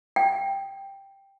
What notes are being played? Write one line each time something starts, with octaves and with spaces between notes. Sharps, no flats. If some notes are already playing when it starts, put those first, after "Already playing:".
G5